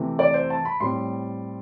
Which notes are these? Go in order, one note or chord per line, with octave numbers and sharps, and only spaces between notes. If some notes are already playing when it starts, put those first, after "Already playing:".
Already playing: C3 E3 A3
D5
C5
A5
B5
A2 G3 C4 C6